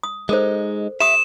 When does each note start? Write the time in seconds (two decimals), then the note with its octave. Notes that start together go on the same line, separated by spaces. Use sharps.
0.03 D#6
0.29 G#3 D#4 A4 A#4 C5
1.00 G4 E5 D#6 E7